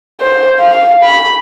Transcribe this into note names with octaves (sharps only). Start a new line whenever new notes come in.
C5
F5
B5